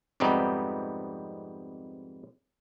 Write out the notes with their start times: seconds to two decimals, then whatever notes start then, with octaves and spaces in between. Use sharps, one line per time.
0.20 F2 G#2 C3 G3 B3 D#4